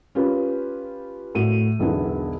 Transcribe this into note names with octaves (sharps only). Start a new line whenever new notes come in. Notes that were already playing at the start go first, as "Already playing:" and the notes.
C#4 F4 G4 B4
A2 F#4 D#7
E1 B1 D3 B3 E4